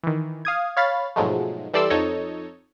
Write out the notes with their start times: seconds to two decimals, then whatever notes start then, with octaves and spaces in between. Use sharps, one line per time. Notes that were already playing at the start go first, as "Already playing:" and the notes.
0.03 D#3 E3
0.45 F5 D#6 G#6
0.77 C#5 F5 B5 A6
1.16 G#2 B2 F3 F#3 G#3 A3
1.73 E3 G3 A4 D5 C6 E6
1.90 F2 D#4 A4 C#5 D#5